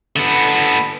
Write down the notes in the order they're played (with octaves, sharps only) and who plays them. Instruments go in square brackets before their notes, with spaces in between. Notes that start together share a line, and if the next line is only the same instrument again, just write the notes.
[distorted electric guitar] D3 B3